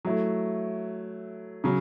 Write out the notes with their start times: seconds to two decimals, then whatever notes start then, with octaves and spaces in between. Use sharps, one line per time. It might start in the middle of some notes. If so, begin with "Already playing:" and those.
0.05 F#3 A3 E4
1.64 C#3 F#3